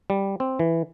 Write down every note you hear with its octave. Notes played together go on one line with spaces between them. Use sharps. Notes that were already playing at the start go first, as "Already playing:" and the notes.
G3
C4
E3